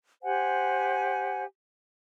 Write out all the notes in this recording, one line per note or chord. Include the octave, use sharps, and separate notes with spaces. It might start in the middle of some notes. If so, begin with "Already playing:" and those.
G4 C5 F#5 G#5